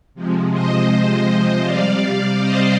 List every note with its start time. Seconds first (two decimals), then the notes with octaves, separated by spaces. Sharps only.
0.14 C3 F3 G#3
0.52 C5 D#5
0.89 C5 D#5
1.64 C3 G3 D5 F5
2.39 C5 D#5